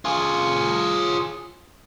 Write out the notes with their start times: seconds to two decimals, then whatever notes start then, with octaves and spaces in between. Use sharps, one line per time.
0.05 F4 G#4